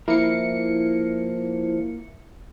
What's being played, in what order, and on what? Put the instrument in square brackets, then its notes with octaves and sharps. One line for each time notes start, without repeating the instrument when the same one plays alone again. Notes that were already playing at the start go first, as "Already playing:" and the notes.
[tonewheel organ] F3 [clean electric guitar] A#3 A#4 [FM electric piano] E4 C#7